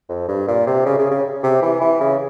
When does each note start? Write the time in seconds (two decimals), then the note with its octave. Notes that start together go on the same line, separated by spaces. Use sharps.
0.09 F2
0.28 G2
0.47 A#2
0.67 C3
0.86 C#3
0.98 C#3
1.11 C#3
1.43 C3
1.62 E3
1.81 E3
2.00 C#3